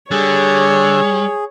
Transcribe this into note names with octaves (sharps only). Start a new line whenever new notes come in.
D3 G3 G#4 C#5